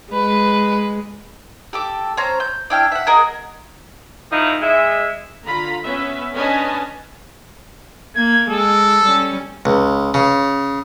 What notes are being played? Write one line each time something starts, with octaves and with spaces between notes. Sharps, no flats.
G#3 B4
G4 A4 D6
C#4 C5 A#5
G6
D4 E4 G5 F6
E5 F#5
G#4 A#4 D#5 F#5
D#3 F3 D#4 E4
G#3 E5
D3 F4 A#5 B5
B3 C#4 B4 E5
C#4 D4 B4 D#5 G#5 A5
A#3 G#6
G#3 A4
G3 C#4
C#2
C#3